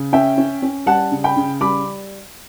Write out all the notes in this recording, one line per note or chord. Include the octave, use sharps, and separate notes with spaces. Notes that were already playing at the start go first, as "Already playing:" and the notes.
Already playing: C#3
C#4 E5 G5
C#4
C#4
G3 F#5 A5
C#3
G5 B5
C#3
G3 B5 D6